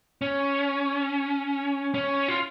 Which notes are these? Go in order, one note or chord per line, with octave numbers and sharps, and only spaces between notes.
C#4
C#4
F4